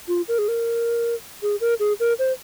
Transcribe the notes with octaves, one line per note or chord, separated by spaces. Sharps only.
F4
A#4
G#4
A#4
G#4
A#4
G#4
A#4
C5